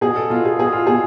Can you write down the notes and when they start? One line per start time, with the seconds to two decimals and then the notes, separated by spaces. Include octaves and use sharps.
0.01 B2 G#4
0.16 A4
0.30 B2 F4
0.45 G#4
0.59 B2 G#4
0.73 F4
0.87 B2 G#4